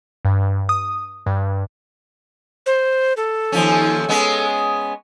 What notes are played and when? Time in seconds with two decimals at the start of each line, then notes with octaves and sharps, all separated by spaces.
0.25 G2
0.69 D#6
1.26 G2
2.66 C5
3.17 A4
3.52 D#2 F3 C#4
4.09 G#3 B3 C#4